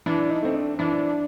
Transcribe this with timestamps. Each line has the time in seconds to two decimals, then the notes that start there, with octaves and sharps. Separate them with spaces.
0.06 E3 D4
0.30 D#4
0.42 A3 C4
0.55 D4
0.79 E3 D4